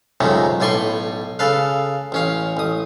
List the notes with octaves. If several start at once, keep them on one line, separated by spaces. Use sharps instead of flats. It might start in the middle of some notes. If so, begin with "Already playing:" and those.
C#2 F#2 C3 D#3 F#3 A3
B1 A2 D5 G#5 C6 C#6
C#3 A4 B4 F5
A1 C#4 F5
A1 D#6